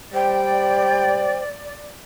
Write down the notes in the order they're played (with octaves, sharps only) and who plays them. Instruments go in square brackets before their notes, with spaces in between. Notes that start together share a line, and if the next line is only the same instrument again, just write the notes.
[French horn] G3 [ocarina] C5 [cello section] D5 [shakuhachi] G5